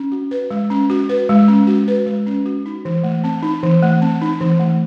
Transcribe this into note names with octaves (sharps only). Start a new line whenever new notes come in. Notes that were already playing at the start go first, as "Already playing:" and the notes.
Already playing: C#4
F#4
B4
G#3
C#4
F#4
B4
G#3
C#4
F#4
B4
G#3
C#4
F#4
D#4
E3
A3
C4
D#4
E3
A3
C4
D#4
E3
A3